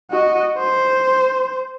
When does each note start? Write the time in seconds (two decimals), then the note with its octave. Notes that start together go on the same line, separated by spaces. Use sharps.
0.11 F#4 D#5
0.58 C5